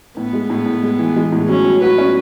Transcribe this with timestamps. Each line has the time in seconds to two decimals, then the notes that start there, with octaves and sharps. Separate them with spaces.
0.17 A2 B3
0.33 G#3
0.50 A2
0.66 A2
0.83 G#3
0.99 E3
1.16 G#3
1.32 A2
1.49 F#3 C#4
1.65 F#3
1.81 F#4 B4
1.98 C#4